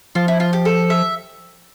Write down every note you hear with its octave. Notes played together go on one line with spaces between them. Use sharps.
F3 F4
E4
F4
G4
A4
E5